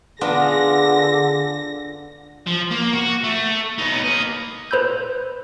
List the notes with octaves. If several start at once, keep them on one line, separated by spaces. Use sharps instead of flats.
D3 B3 D4 F4 G#4 A#6
F3
A#3
F#4
A3
B3 D#4
A#3 D#5
B4 C5 B5 E6 G6